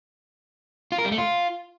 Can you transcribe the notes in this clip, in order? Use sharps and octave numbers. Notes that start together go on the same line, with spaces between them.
F4
A#4
G3
A3
F4